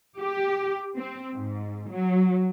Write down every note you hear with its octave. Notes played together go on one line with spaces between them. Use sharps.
G4
C4
G#2
F#3